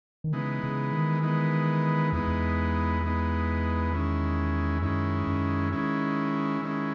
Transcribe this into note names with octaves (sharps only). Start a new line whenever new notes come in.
D#3
C#3 E3 G#3 B3 D#4
C#3
D#3
E3 G#3 B3 D#4
E2 E3 G#3 B3 D#4
E2
E3 G#3 B3 D#4
D#3 G#3 C#4 E4
F#2 D#3 G#3 C#4 E4
F#2
D#3 G#3 C#4 E4
D#3 G#3 C#4 E4